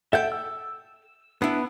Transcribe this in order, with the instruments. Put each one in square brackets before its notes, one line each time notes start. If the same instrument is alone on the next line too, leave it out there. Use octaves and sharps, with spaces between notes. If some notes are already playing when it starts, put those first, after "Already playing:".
[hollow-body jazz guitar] A4 G5 [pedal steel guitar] E5 F#5 G6
[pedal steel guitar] E6
[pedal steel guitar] B3 [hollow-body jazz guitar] D4 E4